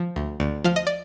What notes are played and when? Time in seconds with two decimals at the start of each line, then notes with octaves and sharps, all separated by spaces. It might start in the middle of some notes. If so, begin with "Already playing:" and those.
Already playing: F3
0.16 D2
0.40 D2
0.64 F3 F5
0.76 D#5
0.87 D5